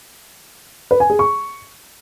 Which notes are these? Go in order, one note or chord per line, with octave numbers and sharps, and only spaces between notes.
B4
G#5
G#4
C#6